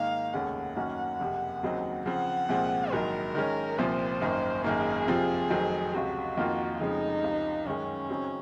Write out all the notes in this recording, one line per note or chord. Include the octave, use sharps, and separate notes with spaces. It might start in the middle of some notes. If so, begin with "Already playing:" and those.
Already playing: G#2 D#3 A#3 D#4 F5
F1 D#2 C#3 G#3 C#4 F#5
F#2 D#3 A#3 C#4 F#4
F#1 F2 C3
D#2 C#3 F#3 C4 D#4
C#3 F3 C4 F#5
C2 A#2 F3 G#3 C4
A#1 G#2 D#3 F#3 A#4
D#3 G#3 C#4
C2 A#2 F3 C4 C5
G#1 F#2 D#3 A#3
G#1 F#2 D#3 A#3 G#4
F2 C3 F3 C4 F4
F1 F2 D#3 F#3 C4
C#2 C3 F#3 F#4
F2 D#3 A#3 F4
F1 F2 C#3 F3 G#3 D#4
C#2 C3 F3
F#2 D#3 G#3 C#4
C#3 F#3 C4 D#4